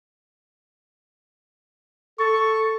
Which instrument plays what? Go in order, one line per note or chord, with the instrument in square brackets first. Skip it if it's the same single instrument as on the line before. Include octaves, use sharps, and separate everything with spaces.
[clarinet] A4 [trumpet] C#6